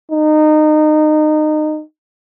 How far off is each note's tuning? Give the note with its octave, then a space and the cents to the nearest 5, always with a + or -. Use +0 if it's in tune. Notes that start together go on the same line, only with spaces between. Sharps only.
D#4 -25